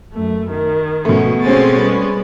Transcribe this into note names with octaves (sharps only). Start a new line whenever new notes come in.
F#2 A3
D#3
B2 A3 C#4
G#3 C4 C#4 C5 A6
G3 B3